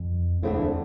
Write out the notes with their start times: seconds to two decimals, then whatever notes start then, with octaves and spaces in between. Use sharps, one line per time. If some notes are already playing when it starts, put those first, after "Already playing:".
Already playing: F2
0.42 E2 D3 A3 C4 E4
0.53 E2